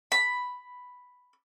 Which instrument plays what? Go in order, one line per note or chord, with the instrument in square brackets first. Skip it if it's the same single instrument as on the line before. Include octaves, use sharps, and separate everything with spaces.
[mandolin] B5